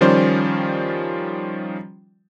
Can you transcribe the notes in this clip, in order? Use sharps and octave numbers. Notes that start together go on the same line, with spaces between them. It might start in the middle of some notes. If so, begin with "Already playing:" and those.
D#3 F3 G3 C#4 C5 D5